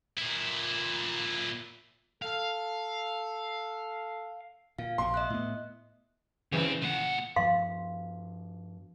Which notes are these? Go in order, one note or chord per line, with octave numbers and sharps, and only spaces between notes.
A#2 E4
A4 F5
A#2 F5
A#1 C3 C6
D#5 E5 F#6
A2 B3
G2 C#3 E3 C4
A#2 F#5
G2 F3 F5 C6